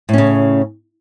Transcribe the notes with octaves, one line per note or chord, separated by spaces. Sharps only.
A2 C#3 C#4